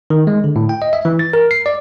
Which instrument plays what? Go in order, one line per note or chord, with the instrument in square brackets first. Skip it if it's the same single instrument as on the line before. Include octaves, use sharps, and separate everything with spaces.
[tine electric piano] D#3
G#3
D3
A2
G5
D#5
E5
E3
A6
A#4
C7
D5